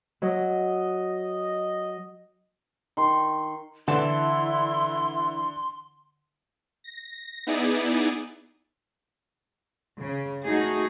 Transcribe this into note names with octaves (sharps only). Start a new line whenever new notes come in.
F#3 D#5
D#3 C6
D3 E3 E4 A5 C6
A#6
B3 D#4 E4 G#4 D5
C#3
A3 D#4 F#4 G#4